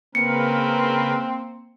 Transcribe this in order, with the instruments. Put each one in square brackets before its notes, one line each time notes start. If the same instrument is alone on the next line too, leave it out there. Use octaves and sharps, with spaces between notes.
[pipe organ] C#3 A#4 B4 [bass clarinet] A#3 [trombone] C4 [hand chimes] C#7